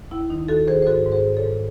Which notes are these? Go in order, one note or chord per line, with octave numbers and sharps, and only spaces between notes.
D#2 E4
D#3 D#4
D#3 F#4 A4
D#3 G#4 C5
C5
G#2 F#4 A4
G#2
G#4 C5
G#2
A4 C#5
G#2